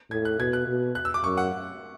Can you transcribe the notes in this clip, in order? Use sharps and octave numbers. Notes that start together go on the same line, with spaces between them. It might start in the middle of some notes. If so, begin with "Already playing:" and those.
A2 G#6
F#6
B2 G#6
F#6
B2
F#6
E6
D6
F#2 C#6
F#5